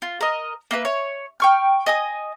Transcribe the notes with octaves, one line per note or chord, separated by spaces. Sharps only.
F4
A#4 D#5
A#3 E4 B4
C#5
G5 C#6 F6
D#5 G#5 D#6